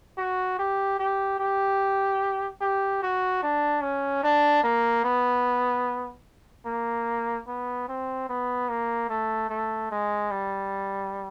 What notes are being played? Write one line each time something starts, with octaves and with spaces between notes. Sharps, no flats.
F#4
G4
G4
G4
G4
F#4
D4
C#4
D4
A#3
B3
A#3
B3
C4
B3
A#3
A3
A3
G#3
G3